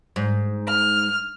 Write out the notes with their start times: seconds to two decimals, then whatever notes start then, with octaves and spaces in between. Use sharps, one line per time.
0.16 G#2
0.67 F6